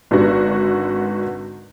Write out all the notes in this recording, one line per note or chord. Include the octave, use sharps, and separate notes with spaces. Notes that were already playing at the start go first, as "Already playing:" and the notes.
G#1 D3 B3 F#4